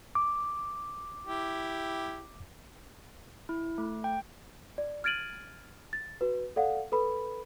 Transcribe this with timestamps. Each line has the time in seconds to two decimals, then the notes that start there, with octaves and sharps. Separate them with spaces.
0.15 D6
1.26 E4 G4
3.49 E4
3.78 A3
4.04 G5
4.78 D5
5.04 F6 G#6 A6 D7 D#7 F#7
5.93 A6
6.21 F#4 B4
6.56 A4 D5 F5 F#5
6.92 A4 B4 B5